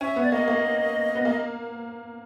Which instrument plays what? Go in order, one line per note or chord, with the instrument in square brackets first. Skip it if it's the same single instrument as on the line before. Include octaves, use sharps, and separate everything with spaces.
[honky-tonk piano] C#4 [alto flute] E5
[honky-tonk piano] B3
[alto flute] D5
[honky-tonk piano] A#3 [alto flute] D#5
[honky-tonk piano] A#3
B3
A#3